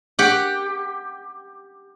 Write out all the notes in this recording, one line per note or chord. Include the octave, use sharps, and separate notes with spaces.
G4 F#5